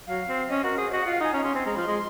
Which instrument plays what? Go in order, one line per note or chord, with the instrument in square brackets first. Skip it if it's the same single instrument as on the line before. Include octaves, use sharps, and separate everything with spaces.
[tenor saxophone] F#3 [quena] F5
[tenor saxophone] C4
[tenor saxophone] C#4 [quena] D#5
[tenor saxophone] F#4 [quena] A#4
[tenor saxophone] G#4 [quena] C5
[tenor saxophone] F#4 [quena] D#5
[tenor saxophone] F4 [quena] F#5
[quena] F5
[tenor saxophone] D#4 [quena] G#5
[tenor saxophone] C#4 [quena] A#5
[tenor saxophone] C#4 [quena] C6
[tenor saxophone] C4 [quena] G#5
[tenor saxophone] G#3 [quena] A#5
[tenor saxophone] F3 [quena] C6
[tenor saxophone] G#3